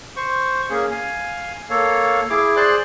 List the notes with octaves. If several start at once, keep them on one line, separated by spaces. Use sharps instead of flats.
C5 C#6
A#3 C#4 G#4
F5 G#5
A#3 A4 C#5 F5
E4 G#4 D6
G#4 C5 D5 C6 F#6